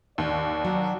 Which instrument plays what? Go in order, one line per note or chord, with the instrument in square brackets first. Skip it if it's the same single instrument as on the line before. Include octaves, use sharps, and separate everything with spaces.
[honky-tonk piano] D#2 [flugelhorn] D5
[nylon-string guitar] F#3